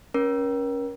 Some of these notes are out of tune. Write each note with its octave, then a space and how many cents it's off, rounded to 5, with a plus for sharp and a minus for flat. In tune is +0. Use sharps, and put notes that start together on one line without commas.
C#4 +0 A#4 +35